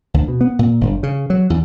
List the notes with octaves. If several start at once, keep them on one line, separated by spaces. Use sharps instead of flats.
D2
B2
B3
A#2
G1
C#3
F#3
E2